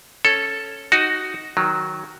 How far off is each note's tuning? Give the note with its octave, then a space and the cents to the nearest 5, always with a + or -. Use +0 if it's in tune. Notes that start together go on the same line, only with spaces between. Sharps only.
C#4 +0 A4 +0 C#5 +0
D#4 +0 F#4 +5
D#3 +0 F#3 +0